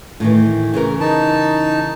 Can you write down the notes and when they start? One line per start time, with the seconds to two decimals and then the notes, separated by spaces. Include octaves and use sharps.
0.20 A2 D#3 E3
0.74 C#3 E3 A#4
1.01 D#4 A5